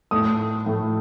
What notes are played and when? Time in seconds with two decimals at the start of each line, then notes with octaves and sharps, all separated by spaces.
0.11 A2 A3 D#6
0.66 A2 A3